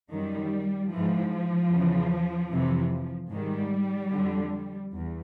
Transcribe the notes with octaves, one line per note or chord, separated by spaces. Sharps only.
F#2 D#3 G3
G#2 E3 F3
E2 C#3 E3
F2 C3 E3
G#2 D#3 G3
F2 D3
E2